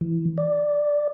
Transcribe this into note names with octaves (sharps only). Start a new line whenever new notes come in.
E3
D5